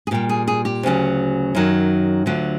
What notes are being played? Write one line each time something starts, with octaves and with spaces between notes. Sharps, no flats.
G#4
A#2 G3 G4
G#4
G#4
G4
D2 C#3 F#3
F#2 D#3 F#3
D2 D3 F#3 F4